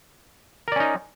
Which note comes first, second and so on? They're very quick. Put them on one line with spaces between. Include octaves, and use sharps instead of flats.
A#4 D5 C#4 D#4